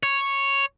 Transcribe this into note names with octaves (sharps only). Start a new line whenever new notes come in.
C#5